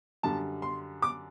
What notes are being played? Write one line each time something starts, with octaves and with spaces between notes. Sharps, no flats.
F#2 D3 G3 A5
C6
D6